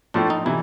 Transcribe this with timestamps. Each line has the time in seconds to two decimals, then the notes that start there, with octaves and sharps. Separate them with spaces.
0.14 A2 F3 A3 D4
0.30 D#4
0.46 C3 E3 E4